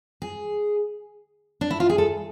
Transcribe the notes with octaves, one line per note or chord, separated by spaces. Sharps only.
G#4
D4
E4
F4
G#4
A4